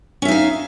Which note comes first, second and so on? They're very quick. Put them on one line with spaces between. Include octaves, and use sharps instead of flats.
C#4 E5 D#4 F5